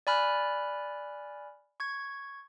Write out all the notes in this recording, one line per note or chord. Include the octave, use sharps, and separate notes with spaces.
D5 G#5 B5 F6 F#6
C#6 G#6